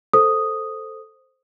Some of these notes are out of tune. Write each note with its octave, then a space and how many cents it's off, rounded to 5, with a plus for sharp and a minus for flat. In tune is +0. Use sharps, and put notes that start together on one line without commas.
A4 +0 C5 +0 D#6 +0